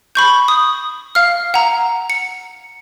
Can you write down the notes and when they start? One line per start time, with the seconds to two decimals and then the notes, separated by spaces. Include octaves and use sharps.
0.15 B5 C#6 G6
0.48 D#6
1.15 F5 F6
1.54 F#5 A#5
2.10 C#7